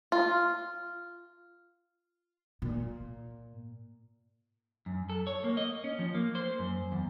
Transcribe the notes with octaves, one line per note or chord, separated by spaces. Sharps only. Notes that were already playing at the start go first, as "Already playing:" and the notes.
F4
A#2
F#2
A4
C#5
A#3
D#5
C#4
F3
A#3
C5
F#2
E2